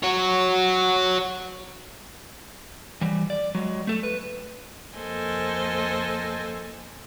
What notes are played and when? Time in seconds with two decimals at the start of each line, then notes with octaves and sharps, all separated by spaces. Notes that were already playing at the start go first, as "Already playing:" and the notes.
0.03 F#4 C#5
3.01 E3 G3
3.30 D5
3.55 F#3 G#3
3.87 A3 A4
4.03 B4
4.97 F2 A#3 A4 C5 D#5 G#5